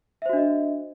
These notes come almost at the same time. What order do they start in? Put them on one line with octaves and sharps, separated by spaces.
E5 C5 F#4 D4 D#5